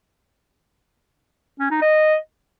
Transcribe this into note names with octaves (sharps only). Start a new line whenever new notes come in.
C#4
D#4
D#5